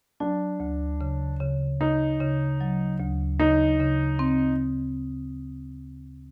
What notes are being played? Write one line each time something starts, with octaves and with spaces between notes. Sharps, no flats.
F#3 D4
D2
C#3
C#3
C#3 D#4
C#3
F#3
D2
C#3 D#4
C#3
C4